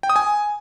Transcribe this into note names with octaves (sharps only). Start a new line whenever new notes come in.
G5
D#6
G#5